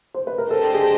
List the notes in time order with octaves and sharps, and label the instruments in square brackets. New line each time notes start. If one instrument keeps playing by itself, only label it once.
[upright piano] C5
B4
A#4
[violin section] D4 G4 C5 D#5 [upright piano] A4
[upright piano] G#4